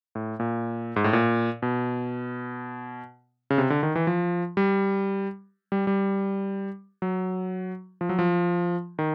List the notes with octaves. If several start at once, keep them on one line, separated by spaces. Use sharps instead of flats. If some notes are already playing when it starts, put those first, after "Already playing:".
A2
A#2
G#2
A2
A#2
B2
C#3
C3
D3
D#3
E3
F3
G3
G3
G3
F#3
F3
F#3
F3
D#3